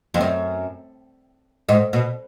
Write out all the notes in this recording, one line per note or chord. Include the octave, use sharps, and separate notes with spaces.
F2
F#2
G#2
B2